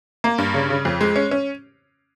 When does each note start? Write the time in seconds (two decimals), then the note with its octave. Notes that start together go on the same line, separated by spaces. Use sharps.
0.24 A#3
0.38 G2
0.54 C#3
0.70 C#3
0.85 F2
1.01 G#3
1.16 C#4
1.31 C#4